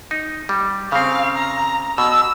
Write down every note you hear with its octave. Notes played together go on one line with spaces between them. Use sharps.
D#4
G3
C#3 C4 F5
A#5
B2 E6